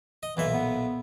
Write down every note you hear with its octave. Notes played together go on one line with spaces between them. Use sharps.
D#5
B1 A#2 E3 E5
B3